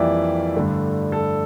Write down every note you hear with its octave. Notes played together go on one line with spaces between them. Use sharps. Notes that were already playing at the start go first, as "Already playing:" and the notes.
Already playing: F2 E3 G3 A#3 D5 E5
G2 D3 A3
A4